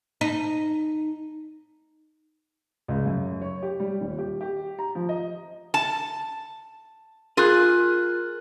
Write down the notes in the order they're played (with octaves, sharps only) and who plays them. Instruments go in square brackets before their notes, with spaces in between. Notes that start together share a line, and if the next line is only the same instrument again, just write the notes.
[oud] D#4
[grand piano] C#2
F#2
C#5
G4
G3
D#1
G4
G4
A#5
F3
D#5
[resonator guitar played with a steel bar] A5
[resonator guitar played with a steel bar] F4 G#4 [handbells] A#4 F#6